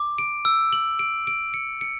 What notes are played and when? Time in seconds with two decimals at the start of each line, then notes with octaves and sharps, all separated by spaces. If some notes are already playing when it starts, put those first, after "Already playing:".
Already playing: D6
0.18 D7
0.45 E6
0.73 F#7
0.99 D7
1.27 D7
1.54 C#7
1.81 C#7